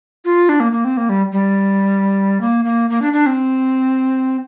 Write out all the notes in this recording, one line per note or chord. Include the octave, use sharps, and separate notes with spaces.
F4
D4
A#3
A#3
C4
A#3
G3
G3
A#3
A#3
A#3
D4
D4
C4